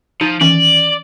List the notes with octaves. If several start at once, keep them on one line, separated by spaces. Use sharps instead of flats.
F3 D#4
D#3 E3 C#4 D5